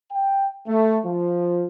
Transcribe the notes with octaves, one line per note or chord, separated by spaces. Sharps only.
G5
A3
F3